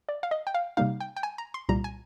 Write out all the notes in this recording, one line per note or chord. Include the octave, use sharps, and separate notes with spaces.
D5
F5
D#5
G5
F5
C3 G3 A#3 D#4 F5
G5
G5
G#5
A#5
C6
C2 A#2 G3 A#5
G#5